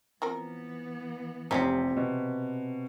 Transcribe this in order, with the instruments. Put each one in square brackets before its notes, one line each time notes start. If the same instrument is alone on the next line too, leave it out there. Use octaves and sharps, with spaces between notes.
[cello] E3 B3 [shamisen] F3 C4 A#4
[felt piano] F1 [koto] C3 [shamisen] F3 C#4 D#4
[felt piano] B2